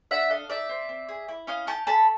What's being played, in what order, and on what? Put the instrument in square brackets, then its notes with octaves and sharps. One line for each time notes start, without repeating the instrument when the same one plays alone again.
[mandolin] D4 E5 F#5
A4 D#5 F5
D#4 D5 E5
C4
C4
G#4
E4
C#4 D#5 F5
C#4 G5 A5
A4 A5 B5